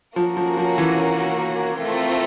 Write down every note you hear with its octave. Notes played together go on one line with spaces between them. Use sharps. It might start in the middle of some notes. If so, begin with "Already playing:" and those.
F3 A#3 C#4 F#4 A#4
F3
F3
E3
A3 C4 F4 A#4